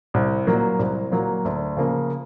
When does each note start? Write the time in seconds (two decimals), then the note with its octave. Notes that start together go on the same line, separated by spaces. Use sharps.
0.14 C2
0.47 A#2 F#3 A#3
0.79 C2
1.11 A#2 F#3 A#3
1.45 D2
1.77 C#3 F3 A#3